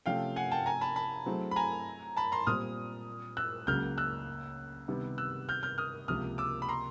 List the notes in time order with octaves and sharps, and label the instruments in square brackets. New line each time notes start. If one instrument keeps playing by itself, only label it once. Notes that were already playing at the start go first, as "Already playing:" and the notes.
[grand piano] C3 F3 A3 C#4 [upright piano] F5 G5
[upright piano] F#5 G#5
G5 A5
G#5 A#5
A5 B5
A5 B5
[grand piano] F#3 A3 C4 E4 G#4
[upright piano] B5
G#5 A#5
A5 B5
A#5 C6
[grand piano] A#2 G3 C4 [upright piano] D#6 F6
[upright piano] E6 F#6
[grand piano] C#2 C#3 F#3 A#3 [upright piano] F6 G6
[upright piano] E6 F#6
[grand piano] C3 D#3 G3 B3
[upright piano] E6 F#6
F6 G6
F6 G6
D#6 F6
[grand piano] C#2 C3 F3 A#3 [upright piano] D#6 F6
[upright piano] D6 E6
B5
A#5 C6